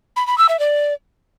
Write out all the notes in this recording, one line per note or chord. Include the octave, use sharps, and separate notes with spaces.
B5
B5
E6
E5
D5